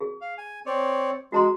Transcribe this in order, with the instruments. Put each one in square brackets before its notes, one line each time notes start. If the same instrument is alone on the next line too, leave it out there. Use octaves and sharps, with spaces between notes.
[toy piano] G#4
[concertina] F5
G#5
C4 C#5 D5
[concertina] G#3 [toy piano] F#4 A#5 C6